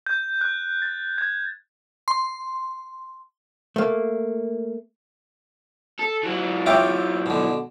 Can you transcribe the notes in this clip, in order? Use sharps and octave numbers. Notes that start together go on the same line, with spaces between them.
G6
F#6
A6
G#6
C6
A3 A#3
A4
E3 F#3
F4 C#5 E5 G5 D6
B2 D3